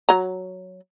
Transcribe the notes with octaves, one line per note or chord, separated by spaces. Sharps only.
F#3 A#5